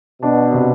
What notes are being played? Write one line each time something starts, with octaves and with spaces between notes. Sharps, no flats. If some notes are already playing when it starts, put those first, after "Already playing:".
B2 D4
C3